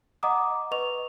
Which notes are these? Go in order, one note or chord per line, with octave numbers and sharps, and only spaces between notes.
D#5 F#5 A#5 D6 D#6
B4 D#5 C#6 F7